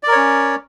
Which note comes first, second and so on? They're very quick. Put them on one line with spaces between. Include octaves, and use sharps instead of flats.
D5 A#4 C#5 C#4